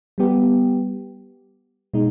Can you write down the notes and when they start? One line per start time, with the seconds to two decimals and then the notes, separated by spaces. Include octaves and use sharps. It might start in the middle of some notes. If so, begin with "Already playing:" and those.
0.18 G3 B3 G4
1.94 B2 G#3 D#4